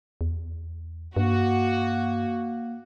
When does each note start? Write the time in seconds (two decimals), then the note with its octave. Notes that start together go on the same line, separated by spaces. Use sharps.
0.21 E2
1.16 G2 A#3 F#4